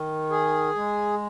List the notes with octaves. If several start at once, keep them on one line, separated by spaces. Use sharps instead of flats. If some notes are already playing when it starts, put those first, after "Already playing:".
Already playing: D#3
G#4
G#3